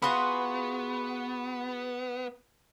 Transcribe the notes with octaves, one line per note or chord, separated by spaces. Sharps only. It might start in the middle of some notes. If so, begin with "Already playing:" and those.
B3 F4 F#4 G#4 B5 C6 D#6 F#6